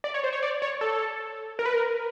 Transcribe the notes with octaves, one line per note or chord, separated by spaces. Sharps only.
D5
C#5
C5
C#5
D5
C#5
A4
A#4
B4
A#4